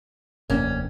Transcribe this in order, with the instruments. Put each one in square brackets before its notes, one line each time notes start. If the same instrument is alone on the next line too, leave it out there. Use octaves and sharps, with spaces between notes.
[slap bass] F1 D#2 [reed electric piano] A#3 D4 [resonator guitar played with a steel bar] C#4